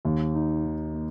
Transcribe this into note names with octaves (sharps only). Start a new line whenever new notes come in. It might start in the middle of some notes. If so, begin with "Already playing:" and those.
D#2
D#4
D#3
A#3